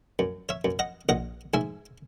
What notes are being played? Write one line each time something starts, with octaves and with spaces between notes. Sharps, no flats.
F#2
C#5 E5
F#2
D#5 F#5
A#1 D#5 F#5
G#2 E5 G#5